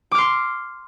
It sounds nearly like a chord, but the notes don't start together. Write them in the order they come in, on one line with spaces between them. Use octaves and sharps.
D6 F6 C6